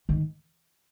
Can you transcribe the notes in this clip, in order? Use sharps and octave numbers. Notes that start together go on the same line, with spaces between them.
D#3